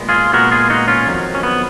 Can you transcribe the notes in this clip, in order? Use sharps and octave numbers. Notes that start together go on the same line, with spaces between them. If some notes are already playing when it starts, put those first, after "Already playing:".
Already playing: A#2 G#3 B3
F4 G#4
A#2 G#3 B3 F#4 A#4
F4 G#4
D#4 F#4
C#4 F4
F2 D#3 F#3
C#4
B3